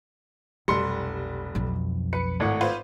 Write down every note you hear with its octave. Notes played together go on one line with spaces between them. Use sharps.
F1 B1 G3 C6 C#7
B1 F2
B4 C#7
G#1 A2 F#5
F4 B4 C5